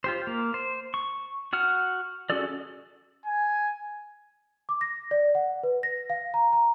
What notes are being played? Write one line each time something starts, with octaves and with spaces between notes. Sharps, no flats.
F4 G4 C5
A#3
C5
C#6
F#4 F#5 F6
C#4 F#4 G#4 A4 D5
G#5
D6
A#6
D5
F#5
B4
A#6
F5
A#5
A#5